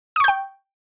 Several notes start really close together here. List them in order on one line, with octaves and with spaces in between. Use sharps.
D#6 C#6 G6 G5